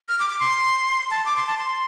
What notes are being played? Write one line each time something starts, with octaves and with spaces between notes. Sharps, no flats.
F6
D6
D6
C6
A5
D6
C6
A5
C6